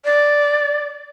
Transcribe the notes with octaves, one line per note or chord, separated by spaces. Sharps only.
D5